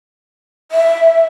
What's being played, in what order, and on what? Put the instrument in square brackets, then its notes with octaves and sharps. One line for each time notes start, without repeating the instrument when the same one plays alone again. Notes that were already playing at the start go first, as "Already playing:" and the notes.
[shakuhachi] E5